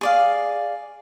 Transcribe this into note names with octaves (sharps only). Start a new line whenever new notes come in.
G#4 D5 F5